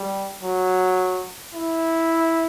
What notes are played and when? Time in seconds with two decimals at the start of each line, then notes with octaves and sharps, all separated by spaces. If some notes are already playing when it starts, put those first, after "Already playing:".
Already playing: G3
0.42 F#3
1.53 E4